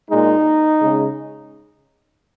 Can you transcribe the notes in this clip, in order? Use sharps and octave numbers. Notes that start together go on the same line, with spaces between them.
A#2 G#3 D#4
C#3 G#3